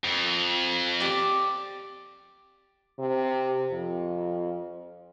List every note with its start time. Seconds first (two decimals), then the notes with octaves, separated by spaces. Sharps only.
0.05 F2
1.00 G4 D5
2.99 C3
3.71 F2